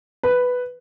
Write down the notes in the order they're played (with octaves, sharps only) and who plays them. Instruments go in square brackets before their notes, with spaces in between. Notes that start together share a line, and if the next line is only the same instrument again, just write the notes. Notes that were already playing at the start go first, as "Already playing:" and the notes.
[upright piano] B4